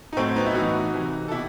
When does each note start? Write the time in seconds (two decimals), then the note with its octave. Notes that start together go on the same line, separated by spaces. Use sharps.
0.13 D#4
0.17 A2 F#3 A3 C4
0.36 B3 D#4
0.46 E4
0.54 A2 E3 D#4 F#4
0.93 C3 E3
1.28 A4
1.31 B2 E4 G4